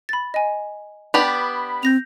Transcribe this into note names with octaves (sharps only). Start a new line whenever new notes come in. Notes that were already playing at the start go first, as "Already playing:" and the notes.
B5 A6
D#5 G#5
B3 D4 G4 B5 F7
C4 G6 A#6 F7